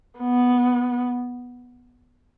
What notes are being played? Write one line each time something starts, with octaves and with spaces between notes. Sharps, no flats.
B3